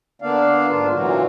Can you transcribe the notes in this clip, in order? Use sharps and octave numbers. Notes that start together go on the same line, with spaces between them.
D3 A#3 B3 D4 D5 F5
G#2 D4 F4
A#2 D3 E3 F#3 A#3 F#4